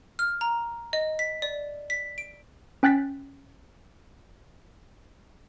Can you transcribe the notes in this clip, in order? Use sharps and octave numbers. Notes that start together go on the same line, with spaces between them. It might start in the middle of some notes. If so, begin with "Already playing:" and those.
F6
A#5
D#5
B6
D5
B6
D7
C#4 G5 F#6 A6 B6